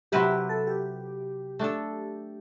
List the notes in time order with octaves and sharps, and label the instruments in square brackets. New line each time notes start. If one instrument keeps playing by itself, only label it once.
[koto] C3 F#3 C4 E4 B4 [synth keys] G4
[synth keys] G4
A4
G4
[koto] A3 D4 A4